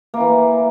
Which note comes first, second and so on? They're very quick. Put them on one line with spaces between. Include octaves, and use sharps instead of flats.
A#3 E4 E3